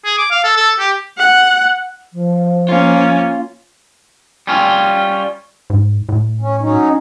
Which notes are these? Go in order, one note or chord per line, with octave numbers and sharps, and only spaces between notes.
G#4
D6
F5
A4
A4
G4
F#5
F3
A#3 C#4 F4
G3 C#4 F4
G#2
A2
C#4
F#3 C#4 D#4